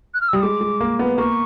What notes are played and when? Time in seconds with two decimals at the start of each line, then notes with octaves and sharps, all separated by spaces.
0.14 F#6
0.21 F6
0.28 E6
0.33 G3 D#6
0.42 G#3 D6
0.61 G#3
0.81 A#3
0.99 B3
1.18 A#3 C#6